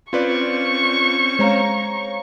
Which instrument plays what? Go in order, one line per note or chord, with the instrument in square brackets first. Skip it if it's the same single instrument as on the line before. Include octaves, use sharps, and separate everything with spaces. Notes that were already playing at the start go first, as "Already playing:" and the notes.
[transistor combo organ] C4 C#4 [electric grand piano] F4 B4 D5 [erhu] C#6
[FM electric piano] G#3 F5 [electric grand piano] C5 C#5 A#5